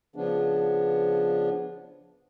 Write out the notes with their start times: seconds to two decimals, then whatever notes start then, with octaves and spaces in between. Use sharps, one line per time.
0.16 C#3 F3 B3 D4